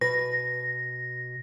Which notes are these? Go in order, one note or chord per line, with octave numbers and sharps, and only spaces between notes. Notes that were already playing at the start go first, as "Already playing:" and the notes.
B2 B4 A#6